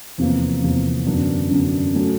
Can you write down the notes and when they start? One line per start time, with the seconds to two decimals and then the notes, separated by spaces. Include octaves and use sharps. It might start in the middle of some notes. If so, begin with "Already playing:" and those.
0.18 E2 C3 F3 A#3
0.63 E2 C3 F3 A#3
1.07 F#2 D3 F#3 B3 D4
1.50 F#2 D3 F#3 B3 D4
1.94 F#3 A3 C#4 F#4 A4